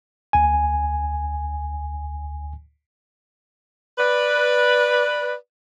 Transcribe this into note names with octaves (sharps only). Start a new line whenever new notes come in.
D2 G#5
B4 D5